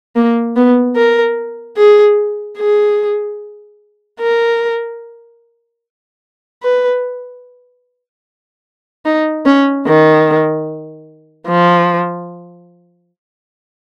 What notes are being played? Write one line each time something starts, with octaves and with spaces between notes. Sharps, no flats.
A#3
B3
A#4
G#4
G#4
A#4
B4
D#4
C#4
D#3
F3